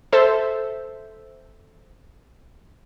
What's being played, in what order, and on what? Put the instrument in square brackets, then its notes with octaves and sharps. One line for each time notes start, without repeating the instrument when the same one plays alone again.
[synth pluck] A4 C5 E5